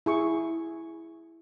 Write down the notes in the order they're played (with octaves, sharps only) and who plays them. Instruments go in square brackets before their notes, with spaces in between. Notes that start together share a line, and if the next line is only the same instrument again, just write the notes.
[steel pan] E4 G#4 C#6